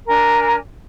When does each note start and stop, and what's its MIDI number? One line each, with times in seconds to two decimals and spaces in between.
0.07 0.56 62
0.07 0.56 70
0.07 0.56 80
0.07 0.56 82